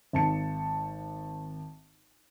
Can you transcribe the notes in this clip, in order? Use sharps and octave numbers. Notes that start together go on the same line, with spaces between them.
G#1 A5 C#7